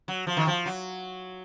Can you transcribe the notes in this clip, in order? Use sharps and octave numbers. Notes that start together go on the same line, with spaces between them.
F#3
F3
D#3
F3
F#3